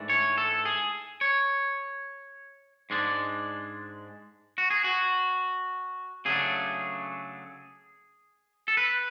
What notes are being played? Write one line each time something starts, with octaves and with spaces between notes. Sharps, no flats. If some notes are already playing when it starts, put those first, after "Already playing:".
Already playing: G#2 E3 A3 D4
C#5
A4
G#4
C#5
G#2 G#3 D4
F#4
G#4
F#4
C#3 F#3 A3 D4 G#4
A4
B4